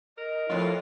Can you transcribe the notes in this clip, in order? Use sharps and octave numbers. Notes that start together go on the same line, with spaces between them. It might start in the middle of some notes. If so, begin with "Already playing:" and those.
A#4 D#5
F2 A2 E4 F4